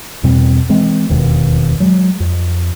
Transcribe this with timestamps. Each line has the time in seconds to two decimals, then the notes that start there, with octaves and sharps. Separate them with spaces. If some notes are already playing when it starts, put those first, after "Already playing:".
0.23 E2 B2 G3 C4
0.69 E3 G#3 C4
1.09 E1 D#2 B2
1.80 F#3 G#3
2.20 F2